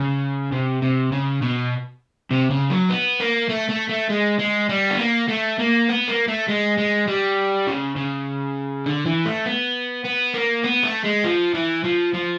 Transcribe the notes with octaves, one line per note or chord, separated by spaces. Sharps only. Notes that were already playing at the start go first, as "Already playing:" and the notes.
Already playing: C#3
C3
C3
C#3
B2
C3
C#3
F#3
B3
A#3
A3
A3
A3
G#3
G#3
G3
B3
A#3
A3
A#3
B3
A#3
A3
G#3
G#3
G3
C#3
C#3
D3
E3
A3
B3
B3
A#3
B3
A3
G#3
F3
E3
F3
F3